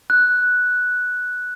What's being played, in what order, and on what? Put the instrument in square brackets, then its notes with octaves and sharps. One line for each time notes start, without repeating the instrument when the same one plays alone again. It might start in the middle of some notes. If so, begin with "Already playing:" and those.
[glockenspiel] F#6